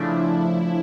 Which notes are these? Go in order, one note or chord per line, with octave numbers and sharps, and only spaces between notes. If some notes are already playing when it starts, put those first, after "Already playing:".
Already playing: C#3 F3 A3 D4 E4